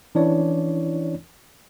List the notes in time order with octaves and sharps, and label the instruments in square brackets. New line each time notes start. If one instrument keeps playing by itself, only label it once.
[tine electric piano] E3 C#4 D4 E4 C#5 D5